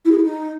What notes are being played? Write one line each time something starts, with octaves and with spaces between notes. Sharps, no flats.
E4
G#4
E4
D#4